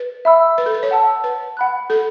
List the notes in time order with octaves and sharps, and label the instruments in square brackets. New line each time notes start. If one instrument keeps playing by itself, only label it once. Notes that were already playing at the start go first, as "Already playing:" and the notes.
Already playing: [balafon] B4
[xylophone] E5 B5 E6
[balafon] B4
A4
B4
C#5
[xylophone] F#5 A5 E6
[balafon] B4
[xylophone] F#5 B5 F#6
[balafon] A4